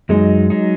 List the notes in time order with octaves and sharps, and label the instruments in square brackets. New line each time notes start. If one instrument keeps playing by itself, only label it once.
[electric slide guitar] F#2 F#3 D#4 [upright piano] G#3
[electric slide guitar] F#3 D#4